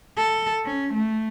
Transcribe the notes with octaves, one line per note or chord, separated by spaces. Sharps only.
A4
C#4
A3